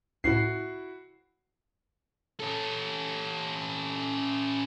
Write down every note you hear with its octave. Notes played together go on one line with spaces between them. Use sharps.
C#2 A2 E4 F#4 C7
C#4 A4